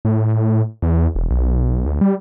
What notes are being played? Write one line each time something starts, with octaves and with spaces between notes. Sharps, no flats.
A2
E2
E1
B1
D2
G3